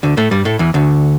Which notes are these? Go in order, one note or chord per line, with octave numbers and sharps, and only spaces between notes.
D2 D3
A2 A3
G2 G3
A2 A3
E2 E3
D2 D3